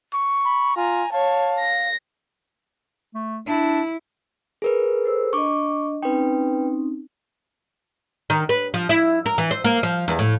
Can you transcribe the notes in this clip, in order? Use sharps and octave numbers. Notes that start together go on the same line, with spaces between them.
C#6
B5
F4 G#5 A#5
C#5 F5 A5
A#6
A3
D4 E4
G#4 A#4 B4
A4 C5 E6
D4 D#5 C#6 D6
C4 C#4 D#4 B4 G5
D#3
B4
F3
E4
A#4
E3
C5
A#3
F3
E2
A2